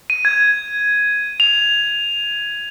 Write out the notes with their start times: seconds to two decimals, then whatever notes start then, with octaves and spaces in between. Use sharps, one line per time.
0.10 D#7
0.25 G#6
1.40 F7